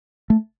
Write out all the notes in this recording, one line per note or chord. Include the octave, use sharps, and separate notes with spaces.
A3